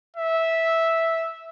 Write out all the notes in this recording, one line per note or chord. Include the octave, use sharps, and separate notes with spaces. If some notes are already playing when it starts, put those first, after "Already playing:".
E5